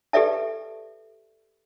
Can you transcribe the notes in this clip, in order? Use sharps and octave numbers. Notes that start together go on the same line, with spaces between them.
G4 A4 B4 D5 E5 A5